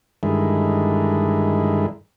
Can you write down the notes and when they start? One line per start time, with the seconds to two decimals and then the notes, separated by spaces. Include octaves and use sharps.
0.23 G2 D3 D#3 G#3 E4